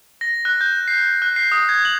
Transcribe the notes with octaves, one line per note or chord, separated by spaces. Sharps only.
A#6
F#6
G6
C7
F#6
C7
D#6
G#6
F#7